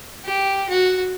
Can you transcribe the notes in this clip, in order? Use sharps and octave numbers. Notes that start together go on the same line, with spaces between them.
G4
F#4